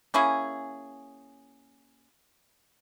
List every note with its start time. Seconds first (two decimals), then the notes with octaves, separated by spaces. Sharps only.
0.14 A#3 C#4 E4 G#4